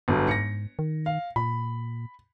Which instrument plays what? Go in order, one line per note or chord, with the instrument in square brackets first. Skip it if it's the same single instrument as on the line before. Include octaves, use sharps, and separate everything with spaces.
[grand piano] G1 G2 F#3 [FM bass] B3
[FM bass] G#2 [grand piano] A#6 C#7
[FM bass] D#3
[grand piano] F5
[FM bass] A#2 [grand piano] B5